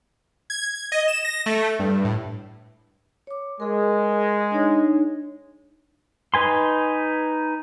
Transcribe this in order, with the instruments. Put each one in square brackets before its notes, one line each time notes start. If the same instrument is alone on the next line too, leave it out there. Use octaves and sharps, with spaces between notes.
[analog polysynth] G#6
G#6
D#5
E7
A#6
A3
G2
A2
[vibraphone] C#5 D6
[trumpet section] G#3 [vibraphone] G#4 A#4
[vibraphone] D4 D#4 C#5
[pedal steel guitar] D#4 B4 G#5 C6